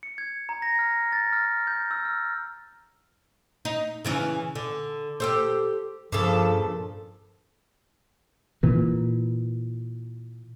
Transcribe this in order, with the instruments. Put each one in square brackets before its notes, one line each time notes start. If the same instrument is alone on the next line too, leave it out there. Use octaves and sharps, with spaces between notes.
[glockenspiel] C#7
G#6
A#5
A#6
F6
A6
F6
G6
E6
F6
[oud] D#4
C#3 E3 C#4
D3
G4 A4 C5
[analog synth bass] G2 [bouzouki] A#2 C#3 A4 [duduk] F3
[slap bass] A#2 E3